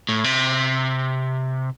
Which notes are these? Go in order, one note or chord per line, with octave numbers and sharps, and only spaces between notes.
A2
C3